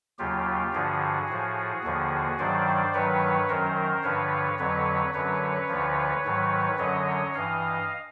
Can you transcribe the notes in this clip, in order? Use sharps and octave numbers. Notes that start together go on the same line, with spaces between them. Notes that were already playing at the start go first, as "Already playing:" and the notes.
D#2 C#3 F#3 F4 G4
G2 D3 F3 F#4 G#4
A2 F3
D#2 D3 F3
G2 D#3 F#3 C5 D5
G2 D#3 F#3 B4 C#5
F#2 D#3 F#3 A#4 C5
G2 D3 F3 B4 C#5
F2 D3 F#3 B4 C#5
F#2 D3 F#3 B4 C#5
D2 D3 F3
G#2 D#3 F#3
F#2 D3 F#3 C#5 D#5
G2 E3 D#5 F5